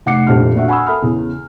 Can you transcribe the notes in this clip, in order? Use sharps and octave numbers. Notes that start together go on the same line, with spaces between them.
F1 F#5 D6 C7 C#7
D#1 A#1 F2 D4 G4 F6
A#1 F#4 E5 F#5
F#5 G#5 B5 C#6 D#6 E6
A4 A#4 E5 B5 D#6 F6
E2 C#3